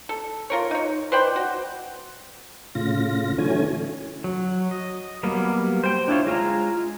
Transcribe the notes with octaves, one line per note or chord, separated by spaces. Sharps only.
A4
F4 A#4 C#5
D#4 C#5
B4 C5 D5 G5
F#4
A2 C#3 F4 A#6
D3 E3 F#3 A3 C#4 G#5
F#3
D#5
F#3 G3 A#3 B3
C5 G5
D4 E4 F4 C#5
G#3 F4 G#4 A#5